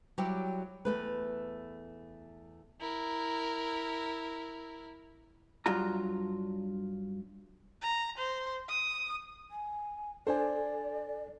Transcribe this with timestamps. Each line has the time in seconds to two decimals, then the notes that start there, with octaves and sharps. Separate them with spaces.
0.18 F#3 G3 E4 G4 C#5
0.85 E2 A3 B4
2.80 E4 A#4
5.66 G2 F#3 F4 A#5
7.82 A#5
8.18 C5
8.69 D#6
9.51 G#5
10.27 D4 A4 C5 D5 G#5